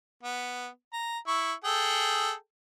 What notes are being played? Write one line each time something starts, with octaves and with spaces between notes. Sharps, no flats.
B3
A#5
E4 C#6
G#4 A4 G5